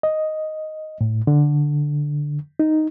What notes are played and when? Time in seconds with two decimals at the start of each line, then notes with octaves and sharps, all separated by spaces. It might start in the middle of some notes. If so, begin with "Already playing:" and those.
0.03 D#5
1.01 A2
1.27 D3
2.60 D#4